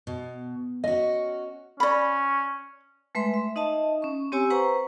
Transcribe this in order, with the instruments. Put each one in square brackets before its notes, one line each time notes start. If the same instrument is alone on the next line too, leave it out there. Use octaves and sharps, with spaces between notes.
[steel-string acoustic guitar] B2
[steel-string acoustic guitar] C#4 F#4 [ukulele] D#5
[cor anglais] C#4 [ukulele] D5 B5
[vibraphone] G#3 A3 B4 E5 C6
E5
D#4 D#5 E5 A5
C#4 C#6
C4 G4 C#5 G#5 E6
B4 C5 F#5 A#5 C#6